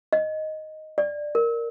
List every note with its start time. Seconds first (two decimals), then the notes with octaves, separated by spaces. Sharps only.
0.13 D#5
0.98 D5
1.35 A#4